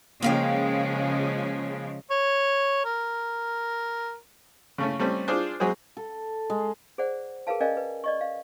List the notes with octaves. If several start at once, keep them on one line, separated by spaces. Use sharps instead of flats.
C#3 F3 G#3 A#3 F5 G5
C#5
A#4
C#3 A3 C#4
G3 A3 C4 C#4
D4 F4 G#4 C5
F#3 G#3 G#4 C5
A4
G#3
G#4 C5 D5 F#5
G#4 A#4 B4 F5 A5
C#4 A#4 D5 D#5 F5 G#5
B4
D5 D#5 C#6
F5